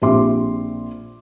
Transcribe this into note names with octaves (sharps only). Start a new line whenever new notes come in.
A#1 C4 G4 E5 C6 D6